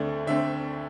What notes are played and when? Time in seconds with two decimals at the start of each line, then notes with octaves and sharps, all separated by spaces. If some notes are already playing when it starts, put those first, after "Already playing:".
Already playing: D2 D3 A3 C4 D5
0.27 D2 D3 A3 C4 E5